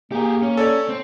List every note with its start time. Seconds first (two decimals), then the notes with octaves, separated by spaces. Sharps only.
0.12 A#3 G4 G#4
0.42 C#4
0.57 A4 C#5 D5
0.89 C4